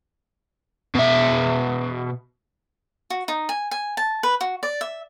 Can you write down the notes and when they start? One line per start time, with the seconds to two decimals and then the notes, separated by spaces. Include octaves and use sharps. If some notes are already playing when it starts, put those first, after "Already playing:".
0.95 B2 E5
3.10 F#4
3.28 D#4
3.49 G#5
3.71 G#5
3.97 A5
4.23 B4
4.41 F#4
4.63 D5
4.81 E5